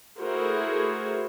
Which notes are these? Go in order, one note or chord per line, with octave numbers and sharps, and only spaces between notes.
A3 E4 F#4 G#4 A#4 C5